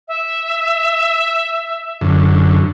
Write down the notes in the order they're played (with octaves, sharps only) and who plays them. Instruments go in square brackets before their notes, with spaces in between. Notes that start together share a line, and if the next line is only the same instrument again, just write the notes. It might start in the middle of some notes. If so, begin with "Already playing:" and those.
[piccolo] E5
[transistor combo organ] F#2 D3